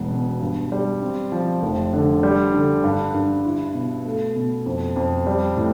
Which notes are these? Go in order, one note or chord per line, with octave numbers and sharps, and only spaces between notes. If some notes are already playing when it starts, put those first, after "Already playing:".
Already playing: E1 B3
B2
G2
G3
C4
F3
F1
D3
G3
D3
G2
G2
E4
B2
A3
B2
F2
F2
G3
A2